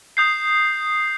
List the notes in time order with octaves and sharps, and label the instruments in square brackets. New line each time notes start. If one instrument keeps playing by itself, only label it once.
[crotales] D#6 G6 C7